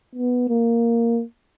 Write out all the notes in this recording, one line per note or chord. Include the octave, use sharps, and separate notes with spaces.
B3
A#3